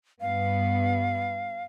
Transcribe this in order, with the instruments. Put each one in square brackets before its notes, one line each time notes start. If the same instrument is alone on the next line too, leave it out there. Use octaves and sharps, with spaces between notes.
[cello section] G2 B3 [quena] F5